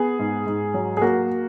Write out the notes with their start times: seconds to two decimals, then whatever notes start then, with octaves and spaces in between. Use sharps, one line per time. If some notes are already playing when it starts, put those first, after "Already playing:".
Already playing: B3 G#4
0.19 G#2
0.46 G#2
0.74 F#3
0.97 G#4
1.01 A#3 F#4